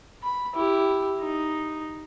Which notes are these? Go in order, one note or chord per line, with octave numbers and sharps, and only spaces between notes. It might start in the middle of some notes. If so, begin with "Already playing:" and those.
B5
E4 G4
D#4